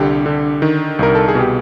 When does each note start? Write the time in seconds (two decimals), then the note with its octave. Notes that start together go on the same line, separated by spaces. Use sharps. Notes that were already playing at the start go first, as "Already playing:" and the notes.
Already playing: C2 D3 G4
0.26 D3
0.62 D#3
0.99 C2 A#4
1.15 A4
1.28 G#4
1.35 B2
1.40 G4